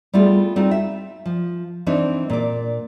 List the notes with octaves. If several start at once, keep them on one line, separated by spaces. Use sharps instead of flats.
G3 A3 B3 E4 F4 G#4
G3 C4 D#4 F4
E5
F3
E3 C4 D4 D#4
A#2 D5